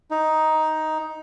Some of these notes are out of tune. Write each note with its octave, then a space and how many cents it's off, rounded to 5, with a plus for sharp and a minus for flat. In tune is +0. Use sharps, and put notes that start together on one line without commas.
D#4 +10